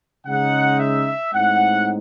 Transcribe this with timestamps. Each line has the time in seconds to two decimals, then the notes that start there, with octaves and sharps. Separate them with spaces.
0.26 C#3 G#3 D#4 F#5
0.80 E5
1.33 A2 G#3 C4 D#4 F#5